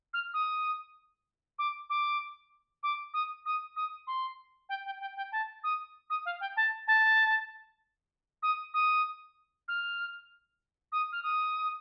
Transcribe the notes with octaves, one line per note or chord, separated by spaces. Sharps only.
F6
D#6
D6
D6
D6
D#6
D#6
D#6
C6
G5
G5
G5
G5
A5
D#6
D#6
F5
G5
A5
A5
D#6
D#6
F6
D#6
F6
D#6